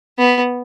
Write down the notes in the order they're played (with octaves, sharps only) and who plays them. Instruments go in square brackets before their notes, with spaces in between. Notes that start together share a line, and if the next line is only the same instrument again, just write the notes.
[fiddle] B3